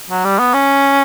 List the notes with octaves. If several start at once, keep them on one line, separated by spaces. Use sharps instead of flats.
F#3
G3
B3
C#4